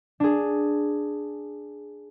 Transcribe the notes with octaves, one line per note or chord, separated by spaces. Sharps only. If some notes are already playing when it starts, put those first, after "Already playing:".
D4 G#4